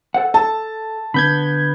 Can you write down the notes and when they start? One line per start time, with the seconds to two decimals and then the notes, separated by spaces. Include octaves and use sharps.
0.14 A4 C5 F#5
0.34 A4 A5
1.14 D3 B3 B5 G6 G#6